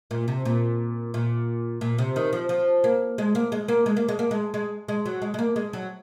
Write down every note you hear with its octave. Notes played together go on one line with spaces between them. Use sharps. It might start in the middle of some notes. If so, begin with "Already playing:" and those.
A#2
C3
A#2
A#2
A#2
C3
D#3
F3
F3
A#3
G#3
A#3
G#3
A#3
G#3
A#3
G#3
A#3
G#3
G#3
G#3
F#3
G#3
G#3
A#3
G#3
F#3